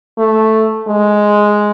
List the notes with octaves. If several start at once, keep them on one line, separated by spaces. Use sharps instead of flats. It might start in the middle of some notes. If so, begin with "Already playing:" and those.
A3
G#3